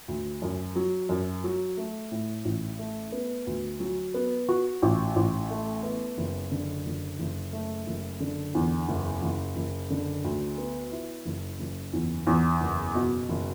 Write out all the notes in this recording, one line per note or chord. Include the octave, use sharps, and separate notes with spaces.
D2
F#2
F#3
F#2
F#3
A3
A2
A1
A3
B3
D2
F#3
B3
F#4
A1
A1
A3
B3
F#1
D3
F#1
F#1
A3
F#1
D3
E2
F#1
F#1
F#1
D3
D2
B3
E4
F#1
F#1
E2
E2
F#1
B2
F#1